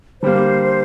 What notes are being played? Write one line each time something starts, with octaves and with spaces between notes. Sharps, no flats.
D3 G3 A#3 C5